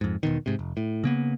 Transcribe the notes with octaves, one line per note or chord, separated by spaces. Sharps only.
F2 G#2
E1 B2 D#3
G#2 C3
F1
A2
C#3 A#3 B3